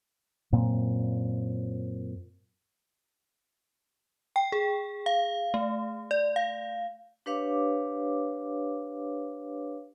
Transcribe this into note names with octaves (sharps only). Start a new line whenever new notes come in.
F#2 A#2 C4
G5
G#4
F5
A3
D5
F5
D4 G4 B4 C#5 F5 D6